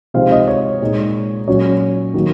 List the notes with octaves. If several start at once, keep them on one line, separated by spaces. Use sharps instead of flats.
C3 F3 G#3 C4 D#4 F5
D#5
C#5
A#2 G#3 D#4
A#2 F#3 C#4 C#5
D#3 F#3 A#3